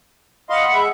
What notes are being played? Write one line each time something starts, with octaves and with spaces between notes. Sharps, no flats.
D#5 F5 F#5 B5 C6
G#3 E5